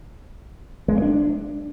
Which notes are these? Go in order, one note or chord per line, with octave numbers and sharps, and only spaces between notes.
G#3
A#3
D4